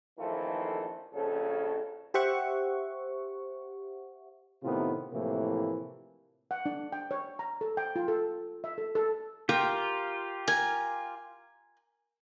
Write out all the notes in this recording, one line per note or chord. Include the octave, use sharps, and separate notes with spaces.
A#1 F2 D#3 E3 A3 F4
A#1 F2 C#3 C#4 A4
G4 C5 E5 F#5 C#6
A2 C3 D#3 B3 F4
A2 C3 E3 F3 A#3
F#5
D4
G5
C#5
A#5
A4
G5
F4
A4
E5
A4
A4
F4 G4 A#4 G5
A#4 G#5